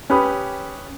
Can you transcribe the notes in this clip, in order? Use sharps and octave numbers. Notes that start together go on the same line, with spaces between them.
C#4 G4 B4 B5 D#6